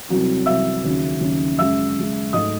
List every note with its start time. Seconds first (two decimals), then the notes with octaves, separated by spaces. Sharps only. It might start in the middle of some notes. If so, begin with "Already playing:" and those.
0.09 C2 C3 F#3 C4
0.46 C2 C3 F#3 C4 E5 E6
0.84 D#2 C#3 F#3 C#4
1.21 D#2 C#3 F#3 C#4
1.58 F#2 C#3 G#3 E5 E6
1.96 F#2 C#3 G#3
2.33 G#2 F#3 A3 D#5 D#6